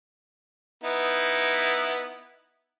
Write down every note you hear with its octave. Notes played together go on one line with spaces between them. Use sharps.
B3 D#4 E4